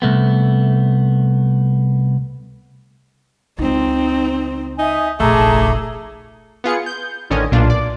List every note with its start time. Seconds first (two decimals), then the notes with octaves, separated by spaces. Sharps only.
0.02 C2 A3 B3
3.59 C#2 C4 D#4
4.79 D#4 E5 G#5 D#6
5.20 F1 A#1 A3 G#4 A5 A#5 D6
6.64 B3 F4 G#4 C#7
6.86 G6
7.30 A1 D3 D#3 C#4 D#5 G#5
7.52 B1 A#2 D4 F4
7.70 D5